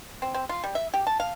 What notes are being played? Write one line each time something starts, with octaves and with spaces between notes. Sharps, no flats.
C4
C4
F4
G3
E5
G4
A5
F5